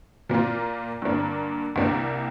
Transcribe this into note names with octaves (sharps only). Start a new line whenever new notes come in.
A#2 A#3 F4
G2 D3 A#3 D4
C2 C3 G3 A#3 D4